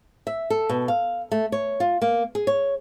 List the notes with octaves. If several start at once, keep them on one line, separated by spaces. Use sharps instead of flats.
E5
A4
B2
F5
A3
C#5
F4
A#3
G#4
C#5